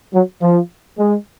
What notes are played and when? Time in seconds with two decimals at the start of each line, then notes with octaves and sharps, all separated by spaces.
0.13 F#3
0.42 F3
0.98 G#3